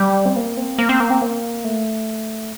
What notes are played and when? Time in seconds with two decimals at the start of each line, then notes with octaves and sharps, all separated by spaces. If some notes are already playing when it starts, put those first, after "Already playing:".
Already playing: G3
0.26 C4
0.36 A#3
0.57 C4
0.78 A#3
0.89 C4
1.00 A#3
1.10 C4
1.22 A#3
1.64 A3